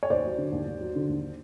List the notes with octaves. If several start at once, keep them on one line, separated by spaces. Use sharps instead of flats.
C#5
D#2 C5 D5
F#3
D3
D#2
D#2
F#3
D3
D#2